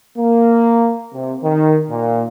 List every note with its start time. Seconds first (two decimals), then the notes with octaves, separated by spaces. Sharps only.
0.18 A#3
1.14 C3
1.43 D#3
1.89 A#2